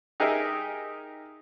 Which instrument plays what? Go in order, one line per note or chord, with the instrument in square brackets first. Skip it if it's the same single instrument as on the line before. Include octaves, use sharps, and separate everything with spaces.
[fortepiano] D#4 G4 G#4 A#4 D#5 E5